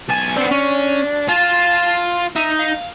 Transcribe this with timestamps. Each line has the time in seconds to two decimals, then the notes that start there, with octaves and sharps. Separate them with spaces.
0.09 B1 G#5 A5
0.37 B3 C4 D4
0.51 C#4
1.29 F4 A5
2.36 D#4 E5
2.59 F5